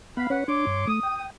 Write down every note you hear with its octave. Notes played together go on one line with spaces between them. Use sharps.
B3 F5 F#5 B5
C#4 B4 C#5 F#5
D4 C#5 C6 D6
G2
A3 D#6
G5